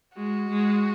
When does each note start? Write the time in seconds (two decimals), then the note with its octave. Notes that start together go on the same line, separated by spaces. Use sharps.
0.15 G#3 F#4
0.49 G#3